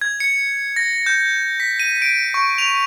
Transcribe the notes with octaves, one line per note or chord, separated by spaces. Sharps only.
G#6
C#7
A#6
G6
B6
D#7
D7
C#6
F7